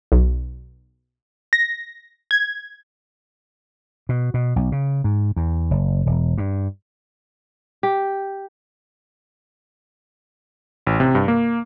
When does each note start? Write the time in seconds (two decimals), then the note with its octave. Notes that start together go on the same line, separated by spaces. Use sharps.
0.12 B1
1.53 A#6
2.31 G#6
4.09 B2
4.34 B2
4.56 B1
4.72 C#3
5.04 G#2
5.36 E2
5.71 F#1
6.06 E1
6.38 G2
7.83 G4
10.87 A1
11.00 C3
11.15 G2
11.28 A#3